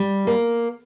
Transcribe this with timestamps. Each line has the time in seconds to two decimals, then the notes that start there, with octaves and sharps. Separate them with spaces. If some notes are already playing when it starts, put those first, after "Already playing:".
Already playing: G3
0.27 A#3